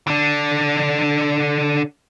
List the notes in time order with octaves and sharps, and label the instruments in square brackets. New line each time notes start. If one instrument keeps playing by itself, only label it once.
[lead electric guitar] D3 D4